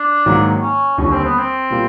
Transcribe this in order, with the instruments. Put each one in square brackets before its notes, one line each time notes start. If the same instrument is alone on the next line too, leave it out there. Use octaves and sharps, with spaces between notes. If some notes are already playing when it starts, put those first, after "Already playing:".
Already playing: [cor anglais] D4
[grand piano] G#2 D#3 F#3 A#3
[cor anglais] C#4
[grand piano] D#2 D3 G3 [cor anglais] C#4
[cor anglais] C4
B3
C4
[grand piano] A#2 G3 A#3